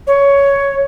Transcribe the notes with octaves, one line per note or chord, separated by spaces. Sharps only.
C#5